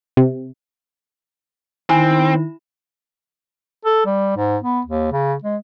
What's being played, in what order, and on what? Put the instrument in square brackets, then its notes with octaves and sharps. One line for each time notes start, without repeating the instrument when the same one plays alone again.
[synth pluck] C3
[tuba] D#3 [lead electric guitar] C4 [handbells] E4 [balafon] G#5
[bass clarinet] A4
G3
G#2
B3
D#2
C#3
G#3